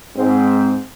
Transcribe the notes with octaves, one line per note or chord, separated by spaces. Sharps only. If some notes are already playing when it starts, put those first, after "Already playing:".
G#2 C4